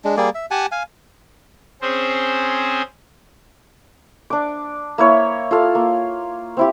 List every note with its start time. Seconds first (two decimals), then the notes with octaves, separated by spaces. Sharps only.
0.04 G#3 D4
0.17 G3 A#3 G#4 D5
0.35 E5
0.51 G4 F#5 G#5 A5
0.72 F5 G#5
1.82 C4 C#4 G#4 C5
4.30 D4 D6
4.98 A#3 E4 C#5
5.51 F4 A4 F5
5.75 A#3
6.57 C4 E4 G4